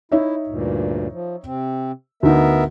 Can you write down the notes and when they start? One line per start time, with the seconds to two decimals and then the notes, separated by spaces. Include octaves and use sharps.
0.12 D#4 E4 C#5 E5
0.47 D2 G2 A#2
1.12 F3
1.45 C3 C4
2.23 D2 B3 D#4 A#4 E5